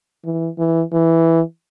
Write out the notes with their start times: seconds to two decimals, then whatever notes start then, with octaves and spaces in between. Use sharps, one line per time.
0.25 E3
0.59 E3
0.93 E3